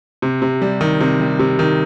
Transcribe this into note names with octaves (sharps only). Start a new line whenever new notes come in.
C3
C3
G3
D#3
C3
G3
C3
D#3